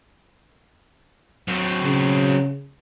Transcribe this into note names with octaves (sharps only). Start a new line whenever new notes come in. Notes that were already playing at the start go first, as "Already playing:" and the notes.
F#3 C4
C#3